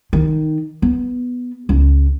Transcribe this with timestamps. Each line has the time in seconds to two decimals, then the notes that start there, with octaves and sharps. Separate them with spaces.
0.13 D#3
0.82 B3
1.69 C#2